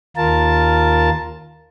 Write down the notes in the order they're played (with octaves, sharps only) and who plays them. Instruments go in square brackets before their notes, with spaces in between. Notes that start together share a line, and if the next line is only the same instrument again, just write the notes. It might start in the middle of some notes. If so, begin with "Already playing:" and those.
[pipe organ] D#2 F4 A#4 A5